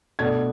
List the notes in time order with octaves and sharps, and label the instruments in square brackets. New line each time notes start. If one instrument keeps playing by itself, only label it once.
[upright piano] B2 A3 D4 G#6